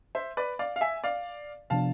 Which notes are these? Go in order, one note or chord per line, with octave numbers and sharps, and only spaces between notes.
C5 E5
B4 D5
D5 F5
F5
E5 G#5
D5 F5
C3 F3 B3 D4 F5 A5